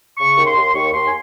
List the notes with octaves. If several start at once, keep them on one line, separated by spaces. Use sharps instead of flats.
C#3 C#6
D#2
C6
D#2
D#2 C#6
D#2 C6
G#5